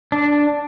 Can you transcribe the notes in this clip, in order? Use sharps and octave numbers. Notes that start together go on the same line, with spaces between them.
D4